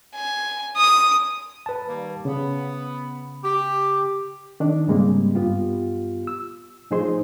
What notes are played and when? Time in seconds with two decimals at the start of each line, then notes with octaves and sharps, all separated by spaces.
0.15 G#5
0.77 D#6
1.66 B4 A5
1.86 D#3 G3 A#3
2.25 C#3 B3
3.43 G4
4.60 D#3 D4
4.87 G#2 C#3 G3 G#3 A#3 C4
5.35 G2 B3 F4 G4
6.27 E6
6.91 A2 F3 D#4 G#4 C5 C6